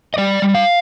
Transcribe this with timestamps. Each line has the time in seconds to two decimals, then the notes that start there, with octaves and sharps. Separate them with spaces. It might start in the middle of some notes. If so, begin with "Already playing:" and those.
0.14 D#5
0.18 G3 D5
0.42 G3
0.54 F5